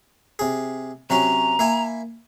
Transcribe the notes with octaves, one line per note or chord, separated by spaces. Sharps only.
C3 G#4
C3 F#3 C#4 A#5
A#3 E4 G#5